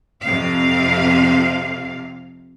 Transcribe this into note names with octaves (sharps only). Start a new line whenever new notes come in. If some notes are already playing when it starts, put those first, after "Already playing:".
F2 C3 F5